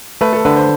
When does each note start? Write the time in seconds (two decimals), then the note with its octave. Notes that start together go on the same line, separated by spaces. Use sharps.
0.21 A3 B4
0.33 A4
0.45 D3 B4
0.56 C5